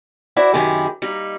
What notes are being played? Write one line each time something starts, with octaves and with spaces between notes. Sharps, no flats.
E4 F#4 C5 D5
F#2 C3 D#3 E4 G4 G#4
G3 A#3 D#4